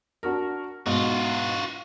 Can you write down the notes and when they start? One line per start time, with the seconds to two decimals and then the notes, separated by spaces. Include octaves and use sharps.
0.23 D4 F#4 A#4
0.86 G#2 B2 D#4 F4 F#4